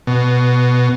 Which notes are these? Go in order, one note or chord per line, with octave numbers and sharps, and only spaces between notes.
B2